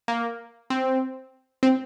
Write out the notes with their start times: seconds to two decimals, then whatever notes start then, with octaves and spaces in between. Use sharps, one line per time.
0.08 A#3
0.70 C4
1.63 C4